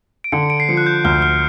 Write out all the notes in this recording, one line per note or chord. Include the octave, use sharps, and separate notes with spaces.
D7
D3 C#7
D7
C7
F3 C#7
F#6
G6
D2 F6
F6